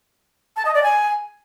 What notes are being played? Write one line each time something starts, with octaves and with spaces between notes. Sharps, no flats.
A5
D#5
D5
G#5